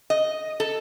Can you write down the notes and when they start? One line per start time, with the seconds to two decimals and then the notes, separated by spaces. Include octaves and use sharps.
0.10 D#5
0.60 A4